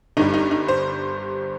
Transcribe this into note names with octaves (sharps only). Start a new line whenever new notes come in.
G1 G2 G3 D#4
D#4
D#4
C5